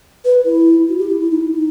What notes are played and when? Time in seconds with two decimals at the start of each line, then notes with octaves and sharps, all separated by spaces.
0.25 B4
0.45 E4
0.89 F#4
0.99 G4
1.09 E4
1.20 E4
1.31 D#4
1.41 E4
1.52 D#4